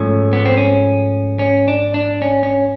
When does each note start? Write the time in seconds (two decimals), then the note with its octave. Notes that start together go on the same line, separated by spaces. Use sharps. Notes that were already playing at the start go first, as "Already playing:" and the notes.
Already playing: G#2 F3 A3 C#4
0.33 B3
0.46 C4
0.57 C#4
1.39 C#4
1.68 D4
1.94 D4
2.22 C#4
2.43 C#4